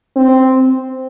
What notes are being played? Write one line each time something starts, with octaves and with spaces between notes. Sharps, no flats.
C4